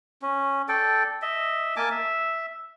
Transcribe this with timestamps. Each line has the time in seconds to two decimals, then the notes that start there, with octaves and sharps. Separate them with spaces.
0.22 C#4
0.69 A4 D5 G5
1.22 D#5 E5
1.76 A#3 G#5 A5 D6
1.91 E5